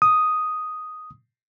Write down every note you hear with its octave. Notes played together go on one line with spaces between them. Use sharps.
D#6